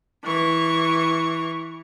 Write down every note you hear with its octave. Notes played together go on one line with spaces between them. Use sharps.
E3 C#6